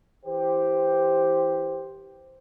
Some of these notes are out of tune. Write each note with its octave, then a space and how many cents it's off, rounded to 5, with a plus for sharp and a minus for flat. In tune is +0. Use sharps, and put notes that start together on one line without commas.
E3 -20 G4 +0 C5 +0